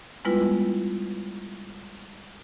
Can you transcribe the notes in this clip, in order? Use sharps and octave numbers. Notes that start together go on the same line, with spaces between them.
G3 G#3 B3 E4 F4 B4